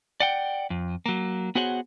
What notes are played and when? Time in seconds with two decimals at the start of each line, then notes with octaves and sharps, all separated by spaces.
0.20 D5 F#5 G5
0.70 F2
1.06 F#3 A#3
1.55 B3 F#4 G#4 C5 C#5 F#5